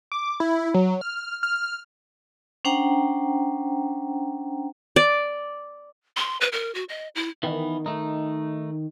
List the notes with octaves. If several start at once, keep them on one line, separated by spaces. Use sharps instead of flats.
D6
E4
F#3
F6
F6
C#4 D4 C5 F#5 G5 A#5
D5
C6
B4
A#4
F#4
D#5
E4
D#3 E3 B3
A3 D#4